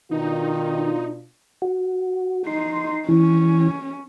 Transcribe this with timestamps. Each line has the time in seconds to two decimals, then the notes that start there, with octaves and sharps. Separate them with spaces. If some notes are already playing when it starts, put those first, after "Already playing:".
0.11 B2 D#3 D4 D#4 F4
1.62 F#4
2.47 D#4 C6
3.09 E3 C#4